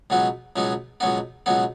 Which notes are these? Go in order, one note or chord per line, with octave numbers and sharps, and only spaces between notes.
C#2 B2 F#3 B3 D#4
C#2 B2 F#3 B3 D#4
C#2 B2 F#3 B3 D#4
C#2 B2 F#3 B3 D#4